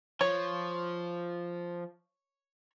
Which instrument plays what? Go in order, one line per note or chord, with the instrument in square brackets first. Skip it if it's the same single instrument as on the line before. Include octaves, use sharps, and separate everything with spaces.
[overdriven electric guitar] F3 [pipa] C#5